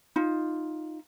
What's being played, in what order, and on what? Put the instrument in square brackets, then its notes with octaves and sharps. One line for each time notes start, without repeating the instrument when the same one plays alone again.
[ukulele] D#4 F4